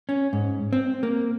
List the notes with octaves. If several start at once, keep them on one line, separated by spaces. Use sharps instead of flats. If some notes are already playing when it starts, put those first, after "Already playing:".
C#4
G#2
C4
A#3